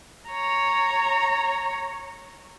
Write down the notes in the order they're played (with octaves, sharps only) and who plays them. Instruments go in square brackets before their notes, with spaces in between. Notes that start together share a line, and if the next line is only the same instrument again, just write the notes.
[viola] C#5 A#5